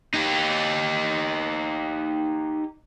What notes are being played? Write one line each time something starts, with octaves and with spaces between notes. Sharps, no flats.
D#4 G4